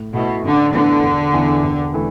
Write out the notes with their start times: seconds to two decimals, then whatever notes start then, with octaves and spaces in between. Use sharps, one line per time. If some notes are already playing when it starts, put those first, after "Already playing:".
Already playing: A2
0.13 B2 A3 E4
0.44 A1 D3
0.73 A2 D3 E3 B3 D4
1.03 E1
1.33 E2 E3
1.64 E1
1.93 E3 A3